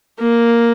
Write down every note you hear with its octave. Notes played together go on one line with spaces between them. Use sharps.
A#3